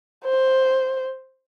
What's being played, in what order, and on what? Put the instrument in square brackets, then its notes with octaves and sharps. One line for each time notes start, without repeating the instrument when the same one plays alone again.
[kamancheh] C5